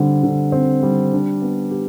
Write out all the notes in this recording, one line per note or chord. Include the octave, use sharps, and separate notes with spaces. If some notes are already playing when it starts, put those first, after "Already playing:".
Already playing: D3 G3 C4
D3
C4
G3
D4
B3
G4